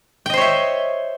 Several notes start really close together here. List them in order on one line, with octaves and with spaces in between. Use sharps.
G5 D#5 C5 C#5 E5